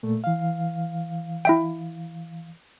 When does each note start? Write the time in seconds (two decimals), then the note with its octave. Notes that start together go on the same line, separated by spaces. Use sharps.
0.03 A#2 A3
0.24 E3 F5
1.45 E4 E5 G5